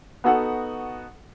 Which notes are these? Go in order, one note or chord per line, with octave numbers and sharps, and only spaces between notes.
B3 D#4 F#4 A4 F#5